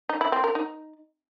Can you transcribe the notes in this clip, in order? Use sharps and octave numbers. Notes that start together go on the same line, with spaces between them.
D#4
E4
C4
A#4
D#4